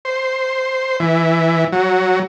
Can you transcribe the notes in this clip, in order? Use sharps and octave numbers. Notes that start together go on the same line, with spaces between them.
C5
E3
F#3